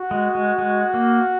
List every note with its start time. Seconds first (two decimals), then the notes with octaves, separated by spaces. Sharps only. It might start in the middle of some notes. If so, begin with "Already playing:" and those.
Already playing: F#4
0.11 G#3
0.35 G#3
0.58 G#3
0.94 A#3